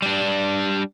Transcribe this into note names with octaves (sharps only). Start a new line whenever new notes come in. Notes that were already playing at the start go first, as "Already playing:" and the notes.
G3 D4